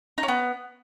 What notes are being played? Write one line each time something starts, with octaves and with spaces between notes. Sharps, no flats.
D#4
C#4
B3